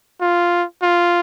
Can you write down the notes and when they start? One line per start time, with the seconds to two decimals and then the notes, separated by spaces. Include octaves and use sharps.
0.21 F4
0.82 F4